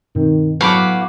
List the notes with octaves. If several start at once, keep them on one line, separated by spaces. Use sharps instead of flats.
G2 B2 D#3 C4
A2 F#3 B3 F#4 F5 B5 D6